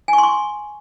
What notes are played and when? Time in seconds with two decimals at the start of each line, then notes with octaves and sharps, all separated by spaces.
0.08 G#5
0.13 C#6
0.18 C6
0.23 C#6